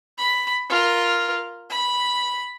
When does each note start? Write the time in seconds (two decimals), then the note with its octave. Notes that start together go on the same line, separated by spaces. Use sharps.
0.18 B5
0.69 F4 A#4
1.70 B5